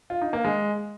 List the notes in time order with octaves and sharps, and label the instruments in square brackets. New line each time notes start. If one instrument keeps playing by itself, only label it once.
[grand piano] F4
D#4
A#3
G#3